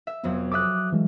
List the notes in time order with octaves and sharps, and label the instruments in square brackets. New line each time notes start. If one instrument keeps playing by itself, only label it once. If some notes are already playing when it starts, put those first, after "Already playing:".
[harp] E5
[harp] F1 F2 F#3 [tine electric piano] B3
[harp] A4 E5 [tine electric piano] D6 D#6 F#6
[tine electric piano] E3 G#3